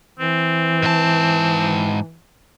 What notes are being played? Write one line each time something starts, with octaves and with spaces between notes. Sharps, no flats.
E3 C4
G#2 A5